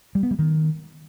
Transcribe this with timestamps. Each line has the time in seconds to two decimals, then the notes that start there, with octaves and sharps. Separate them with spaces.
0.15 G3
0.23 B3
0.31 G3
0.39 D#3